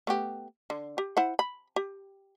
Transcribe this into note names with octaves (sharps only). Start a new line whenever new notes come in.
A3 B3 G4
D3
G4
E4 C5 F#5
B5
G4